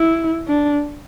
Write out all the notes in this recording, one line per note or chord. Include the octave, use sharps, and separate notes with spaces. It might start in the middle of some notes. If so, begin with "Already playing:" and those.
Already playing: E4
D4